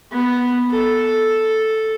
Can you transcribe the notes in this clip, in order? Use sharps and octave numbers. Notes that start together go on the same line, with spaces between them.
B3
A4